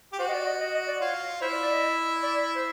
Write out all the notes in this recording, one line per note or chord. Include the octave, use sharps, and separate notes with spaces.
G4
F#4 C5
D#5
D5
D#5
D#5
D#5
D5
F4 C#5
E4 C5
D5
D5
D#5
D5
C5